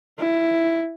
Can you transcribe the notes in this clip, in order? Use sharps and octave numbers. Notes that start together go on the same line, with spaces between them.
E4